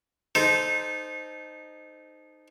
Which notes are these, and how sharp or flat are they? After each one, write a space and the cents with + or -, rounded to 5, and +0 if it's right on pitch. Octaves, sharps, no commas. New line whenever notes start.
D#4 -15 A4 -25 C5 -10